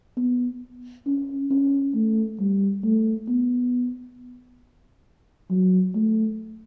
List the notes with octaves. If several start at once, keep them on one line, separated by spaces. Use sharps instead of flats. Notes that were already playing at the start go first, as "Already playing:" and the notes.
B3
C#4
C#4
A3
G3
A3
B3
F#3
A3